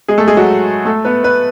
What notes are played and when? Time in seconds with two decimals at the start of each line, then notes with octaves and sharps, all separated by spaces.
0.08 G#3 G#4
0.18 A3 A4
0.28 G#3 G#4
0.37 F#3 F#4
0.85 A3 A4
1.05 B3 B4
1.24 B3 B4